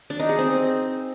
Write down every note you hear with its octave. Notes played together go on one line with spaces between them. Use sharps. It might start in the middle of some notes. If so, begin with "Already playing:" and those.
D4
D#4
G#4
C4